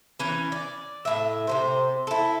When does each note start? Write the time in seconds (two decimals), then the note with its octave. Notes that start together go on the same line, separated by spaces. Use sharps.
0.19 E3 C#4
0.52 D5
1.05 A2 E5
1.47 C3 G3 C5
2.07 E4 A4